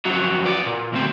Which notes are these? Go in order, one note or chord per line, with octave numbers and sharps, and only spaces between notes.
F2 F#3
B3 D5
A#2
D2 C4